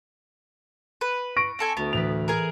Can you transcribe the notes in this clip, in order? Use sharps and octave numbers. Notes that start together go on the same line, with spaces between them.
B4
C#6 A#6 D7
C4 A4 G#5
D2 B3
A2 E3 B4 F7
G#4 A#4 G#5